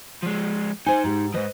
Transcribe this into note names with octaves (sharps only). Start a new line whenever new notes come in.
F3 G#3
D#4 C5 G#5 C6
G#2 G4
G#2 F3 B4 C5 D#5